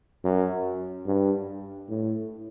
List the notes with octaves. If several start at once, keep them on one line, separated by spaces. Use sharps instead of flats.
F#2
G2
A2